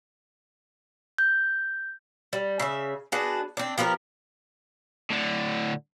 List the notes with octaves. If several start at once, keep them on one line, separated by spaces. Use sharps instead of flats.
G6
G3
C#3 E5
B3 D4 F#4 G#4
C4 D4
F3 B3 G4 A#4
A2 D3